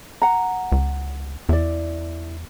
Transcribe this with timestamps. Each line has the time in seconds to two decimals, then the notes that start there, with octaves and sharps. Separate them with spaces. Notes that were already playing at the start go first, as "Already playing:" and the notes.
0.22 F#5 A#5
0.72 C#2
1.49 E2 E4 D5